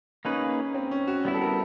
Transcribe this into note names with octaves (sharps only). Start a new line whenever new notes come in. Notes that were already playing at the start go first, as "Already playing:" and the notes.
A#3 C#4 D#4 G#4 B4
C4
C#4
F#4
G3 B3 E4
A4
A#4